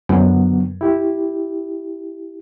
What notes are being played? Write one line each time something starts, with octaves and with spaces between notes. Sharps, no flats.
F#2 D3 F#3 B3
E4 G4